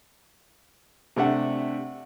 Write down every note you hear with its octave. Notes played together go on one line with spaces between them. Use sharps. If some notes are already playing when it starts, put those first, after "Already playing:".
C3 A3 D4 F#5